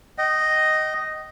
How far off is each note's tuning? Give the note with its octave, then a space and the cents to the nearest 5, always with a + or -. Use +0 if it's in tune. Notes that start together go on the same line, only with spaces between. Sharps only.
D#5 +0 G5 -40